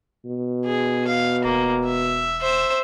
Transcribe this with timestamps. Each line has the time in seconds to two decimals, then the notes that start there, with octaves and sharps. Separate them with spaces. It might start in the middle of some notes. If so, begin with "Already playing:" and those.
0.25 B2
0.65 G#4
1.08 F5
1.45 E1 A#3
1.86 E5
2.42 C5 E5